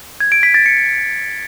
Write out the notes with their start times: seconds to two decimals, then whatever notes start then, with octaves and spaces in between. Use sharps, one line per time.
0.20 G#6
0.32 D7
0.43 B6
0.54 A6
0.66 C#7